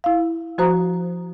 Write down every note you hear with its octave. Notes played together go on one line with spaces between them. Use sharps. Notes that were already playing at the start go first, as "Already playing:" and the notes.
E4 F5
F3 F#4 C5 A#5 D#6